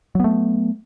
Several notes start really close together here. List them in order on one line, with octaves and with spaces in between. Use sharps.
F#3 B3 A3